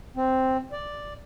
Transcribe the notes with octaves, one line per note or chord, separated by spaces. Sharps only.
C4
D5